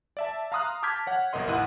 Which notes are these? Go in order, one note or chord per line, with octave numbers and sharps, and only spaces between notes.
D5 E5 A5
F5 A#5 C6 D#6 F6 F#6
A5 D6 F6 G6 G#6 B6
C#5 F#5
G1 C2 A#4 D#5 C6
A1 D#2 E4 F#5 F#6 D#7